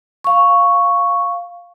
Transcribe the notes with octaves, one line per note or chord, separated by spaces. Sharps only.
F5 C#6